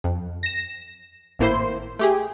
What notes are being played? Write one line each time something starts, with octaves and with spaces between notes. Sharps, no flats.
F2
A#6 E7
G#1 A2 A#3 E4 C5 C6
A3 G4 G#4